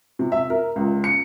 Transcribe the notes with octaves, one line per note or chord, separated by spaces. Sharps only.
C3
E5
A#4
C#2
C#7